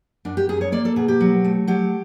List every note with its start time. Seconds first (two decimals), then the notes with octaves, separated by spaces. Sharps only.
0.25 F#2 D4
0.37 G4
0.49 F#2 G#4
0.61 C#5
0.72 A#3 D5
0.85 A4
0.96 B2 G#4
1.08 G4
1.20 F#3
1.44 A3
1.67 F#3 G4